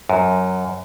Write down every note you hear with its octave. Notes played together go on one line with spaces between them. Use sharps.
F#2